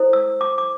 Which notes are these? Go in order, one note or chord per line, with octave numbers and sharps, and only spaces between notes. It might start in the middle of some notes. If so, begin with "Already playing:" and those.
Already playing: E4 A4 C5
E6
D6
D6